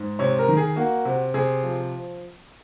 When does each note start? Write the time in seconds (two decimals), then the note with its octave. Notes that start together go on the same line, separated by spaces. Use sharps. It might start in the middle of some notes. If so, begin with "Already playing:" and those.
Already playing: G#2
0.19 C3 C#5
0.39 A#4
0.49 D#3
0.57 G#4
0.76 A#3 F#4
1.05 C3
1.34 C3 G#4
1.63 F3